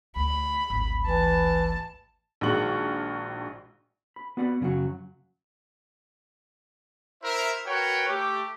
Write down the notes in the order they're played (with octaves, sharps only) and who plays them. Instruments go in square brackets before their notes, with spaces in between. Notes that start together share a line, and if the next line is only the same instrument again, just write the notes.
[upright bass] D2 [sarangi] B5
[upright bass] G#1 D2
[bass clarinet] E3 [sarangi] A5
[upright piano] A#1 D#3 G#3 F#4 C#6 F#7
[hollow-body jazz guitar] B5
B3 F#4 D5 F#5 G5 B5
F#2 C#3 E3 F#3 F#4
[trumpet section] E4 A#4 C5 E5
F#4 A#4 B4 C#5 G5
A3 G4